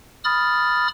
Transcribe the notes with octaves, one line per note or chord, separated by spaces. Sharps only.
B5 D#6 F6 A6